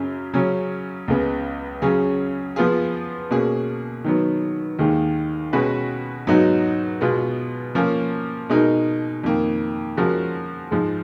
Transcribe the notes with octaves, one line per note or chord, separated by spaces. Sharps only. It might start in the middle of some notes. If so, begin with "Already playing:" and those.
Already playing: F#2 C#3 C#4
C#3 F#3 C#4
C#2 C#3 G#3 B3
C#3 F#3 C#4 G#4
F3 B3 F4 G#4
B2 A#3 C#4 G#4
D#3 F#3 B3
D#2 D#3 G#3
B2 G#3 C#4 F#4 B4
G#2 F#3 B3 D#4 F#4
B2 G#3 B3 F4
F3 A#3 C#4
B2 G#3 D#4 A#4
F2 D#3 A#3
F3 G#3 C#4 F#4 A#4
G#2 F3 G#3